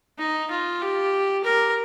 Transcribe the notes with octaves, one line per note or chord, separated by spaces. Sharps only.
D#4
F4
G4
A#4